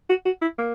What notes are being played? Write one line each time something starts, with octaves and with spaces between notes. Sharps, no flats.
F#4
F#4
E4
A#3